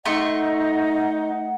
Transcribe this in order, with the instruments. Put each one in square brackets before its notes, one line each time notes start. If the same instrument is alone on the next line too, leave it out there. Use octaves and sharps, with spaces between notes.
[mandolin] A3 C6 C#6 [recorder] D#4 [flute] D#5 [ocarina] F#5